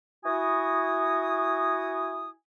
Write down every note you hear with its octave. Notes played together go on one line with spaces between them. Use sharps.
E4 F#4 G#5 D#6